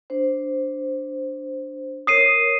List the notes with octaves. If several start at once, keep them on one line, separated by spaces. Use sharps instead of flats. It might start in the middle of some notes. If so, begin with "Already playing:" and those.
D4 C5
A#4 C#5 D#6 C7 D#7